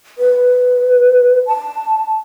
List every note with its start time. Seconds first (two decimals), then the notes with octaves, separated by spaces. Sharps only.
0.18 B4
1.47 A5